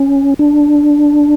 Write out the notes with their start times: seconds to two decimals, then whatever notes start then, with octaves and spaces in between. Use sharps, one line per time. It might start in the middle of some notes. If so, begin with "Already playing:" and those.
Already playing: C#4
0.39 D4